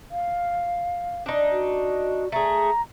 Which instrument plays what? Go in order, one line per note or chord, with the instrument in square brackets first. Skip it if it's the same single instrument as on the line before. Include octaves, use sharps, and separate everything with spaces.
[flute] F5
[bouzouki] D4 D#4
[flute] F#4
[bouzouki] A3 G#4 [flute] A#5